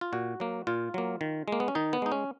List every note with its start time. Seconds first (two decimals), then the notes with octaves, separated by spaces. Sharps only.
0.01 F4
0.13 A#2 F#4
0.40 F#3 A#3
0.67 A#2 F4
0.94 F#3 A#3
1.21 D#3
1.48 G#3 A#3
1.60 B3
1.68 C#4
1.75 D#3 D#4
1.93 B3
2.02 G#3 D#4
2.12 C#4